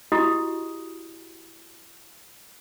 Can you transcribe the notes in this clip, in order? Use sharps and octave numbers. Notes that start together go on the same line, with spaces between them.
E4 F#4 G4 D#5 D#6